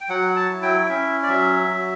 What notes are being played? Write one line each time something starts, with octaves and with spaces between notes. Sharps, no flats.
G5
F#3 F#5
A5
E4
G5
C#4 E5
D5
F#3 E5
F#3